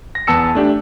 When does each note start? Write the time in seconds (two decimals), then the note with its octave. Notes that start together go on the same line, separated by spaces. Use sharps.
0.15 A#6
0.27 E2 B3 A5 E6 C#7
0.55 A3 D4 G4